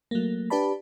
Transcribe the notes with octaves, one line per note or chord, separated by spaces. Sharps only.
F#3 A3 A#3
D4 G4 B4 D5 A5 B5